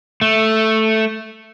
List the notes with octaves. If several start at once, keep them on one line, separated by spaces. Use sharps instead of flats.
A3